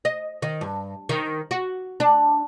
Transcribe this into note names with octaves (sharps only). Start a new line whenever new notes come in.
D#5
D#3
G2
D#3
F#4
D4